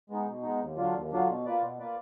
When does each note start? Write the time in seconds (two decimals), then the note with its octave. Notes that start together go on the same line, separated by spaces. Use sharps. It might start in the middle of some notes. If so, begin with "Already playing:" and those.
0.10 G#3 B3 D#4
0.27 B2
0.43 G#3 B3 D#4
0.61 D#2
0.77 D3 F#3 D4 F4
0.94 D#2
1.12 D3 F#3 D4 F4
1.28 B2
1.46 A#3 F4 B4 D5
1.61 B2
1.79 A#3 F4 B4 D5